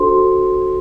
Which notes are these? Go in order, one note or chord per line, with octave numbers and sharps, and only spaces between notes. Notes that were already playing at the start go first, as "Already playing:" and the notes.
Already playing: D4 F#4 A4 C5 C6